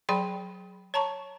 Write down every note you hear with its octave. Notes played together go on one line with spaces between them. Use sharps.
F#3 G#4 D5 G5 B5 C6
C#5 A5 A#5 C#6